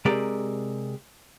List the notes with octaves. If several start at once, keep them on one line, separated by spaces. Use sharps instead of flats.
C3 G#3 G4 A#4 D5 A#5